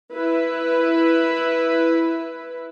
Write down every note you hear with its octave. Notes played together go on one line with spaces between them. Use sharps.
E4 B4